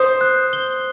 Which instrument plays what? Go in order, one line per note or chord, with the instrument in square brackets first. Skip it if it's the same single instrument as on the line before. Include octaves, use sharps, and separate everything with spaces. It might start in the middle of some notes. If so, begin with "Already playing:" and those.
Already playing: [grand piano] C5 [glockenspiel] D#6
[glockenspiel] F#6
G7